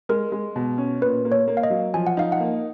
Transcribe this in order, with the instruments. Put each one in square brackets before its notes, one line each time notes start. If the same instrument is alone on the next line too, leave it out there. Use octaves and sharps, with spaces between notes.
[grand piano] G#3 [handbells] A#4
[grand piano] G#3
B2
C#4
[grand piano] A#2 [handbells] B4
[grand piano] A#3
[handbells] C#5
[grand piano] A#3
[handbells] F5
D#5
[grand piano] F#3
[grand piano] F3 [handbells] G#5
[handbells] F#5
[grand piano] D#4 [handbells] F5
[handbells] F#5
[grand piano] A#3